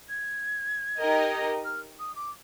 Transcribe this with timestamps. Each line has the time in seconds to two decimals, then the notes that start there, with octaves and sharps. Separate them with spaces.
0.09 G#6
0.98 D#4 G4 A#4 D#5
1.65 F6
2.00 D#6
2.16 D6